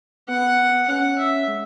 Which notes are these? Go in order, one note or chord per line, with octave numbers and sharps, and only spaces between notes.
B3 F#5
C#4 F#5
E5
G#3